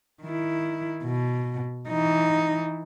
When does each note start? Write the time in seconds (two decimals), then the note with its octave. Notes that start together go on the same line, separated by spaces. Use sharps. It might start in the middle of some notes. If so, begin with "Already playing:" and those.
0.23 D#3 E4
1.04 B2
1.88 E3 D#4